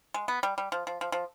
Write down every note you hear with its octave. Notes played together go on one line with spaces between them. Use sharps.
G#3
B3
G3
G3
F3
F3
F3
F3